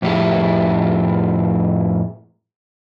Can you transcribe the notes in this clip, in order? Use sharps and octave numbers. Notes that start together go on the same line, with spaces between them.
F2 A2 F3 E4 G4 G#4